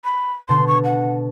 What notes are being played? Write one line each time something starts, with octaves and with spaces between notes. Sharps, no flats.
B5
B2 D3 C6
C#6
F#5